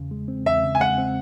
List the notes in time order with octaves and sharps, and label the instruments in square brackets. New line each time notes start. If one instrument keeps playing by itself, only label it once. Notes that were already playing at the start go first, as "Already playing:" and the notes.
Already playing: [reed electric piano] E2 C#3
G#3
C4
[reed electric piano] E2 [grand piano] E5
[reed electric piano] C#3
[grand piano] G#5
[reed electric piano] G#3 [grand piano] F#5
[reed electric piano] C4